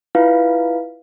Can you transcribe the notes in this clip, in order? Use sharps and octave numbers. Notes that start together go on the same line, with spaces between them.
E4 F4 B4 F5